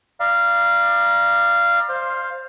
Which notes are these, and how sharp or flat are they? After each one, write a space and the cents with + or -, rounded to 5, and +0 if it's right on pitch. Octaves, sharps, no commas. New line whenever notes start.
D5 +25 F5 -15 A#5 +35
C5 +10 F5 +0